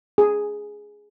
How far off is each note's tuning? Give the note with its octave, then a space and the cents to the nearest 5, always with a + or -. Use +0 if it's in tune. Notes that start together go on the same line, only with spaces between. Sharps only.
G#4 +0